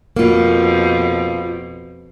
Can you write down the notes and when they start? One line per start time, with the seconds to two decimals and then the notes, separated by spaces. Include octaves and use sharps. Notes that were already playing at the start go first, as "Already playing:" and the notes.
0.16 F2 B2 A#3 F4